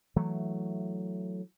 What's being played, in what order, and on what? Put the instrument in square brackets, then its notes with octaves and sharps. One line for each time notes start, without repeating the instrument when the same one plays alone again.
[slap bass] E3 F#3 A3